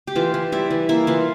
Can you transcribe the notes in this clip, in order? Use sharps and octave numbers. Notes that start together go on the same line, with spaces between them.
G4
E3 F4
E3
G3 E4
E3
A#3 E4
E3 F4